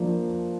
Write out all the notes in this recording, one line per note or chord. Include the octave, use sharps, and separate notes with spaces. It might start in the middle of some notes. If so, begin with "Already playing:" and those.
Already playing: F3 A#3 D4